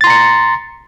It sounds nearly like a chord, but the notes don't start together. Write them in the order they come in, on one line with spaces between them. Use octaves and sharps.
A6 C6 A#5 C#7